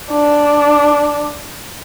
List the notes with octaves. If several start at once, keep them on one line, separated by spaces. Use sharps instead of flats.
D4